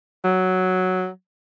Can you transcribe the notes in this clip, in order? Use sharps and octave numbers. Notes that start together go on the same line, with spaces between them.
F#3